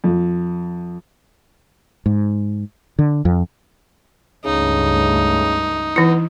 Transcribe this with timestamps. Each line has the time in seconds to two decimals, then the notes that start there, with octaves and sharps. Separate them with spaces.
0.04 F2
2.06 G#2
2.99 D3
3.25 F2
4.45 C#2 G2 C#3 A3 D#4
5.96 E3 B3 E4